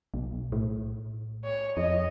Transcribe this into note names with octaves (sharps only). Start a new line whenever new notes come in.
B1
A2
C#5
F2 D#5